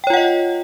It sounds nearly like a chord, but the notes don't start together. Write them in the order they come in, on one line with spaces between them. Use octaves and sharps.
G5 C#5 F4 F#5 D#5